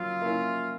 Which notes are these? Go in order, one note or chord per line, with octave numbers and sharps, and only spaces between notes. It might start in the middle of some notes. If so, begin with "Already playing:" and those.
Already playing: F#3 A#3 C#4 F4
A#3 C#4 E4